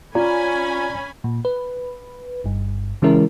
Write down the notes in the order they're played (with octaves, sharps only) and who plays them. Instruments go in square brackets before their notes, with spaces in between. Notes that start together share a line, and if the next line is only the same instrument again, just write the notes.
[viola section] C#4 G#5 B5 [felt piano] F4 [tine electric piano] D5 A#5
[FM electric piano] A#2
B4
G1 G2
C#3 E3 G#3 C#4 E4 A#4